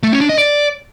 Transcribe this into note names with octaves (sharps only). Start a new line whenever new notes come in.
A3
C#4
D4
D#5
D5